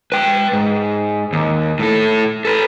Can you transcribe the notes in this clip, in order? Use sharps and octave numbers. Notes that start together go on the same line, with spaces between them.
B4 G5
G#2
D#2
A2 A4
A4 B4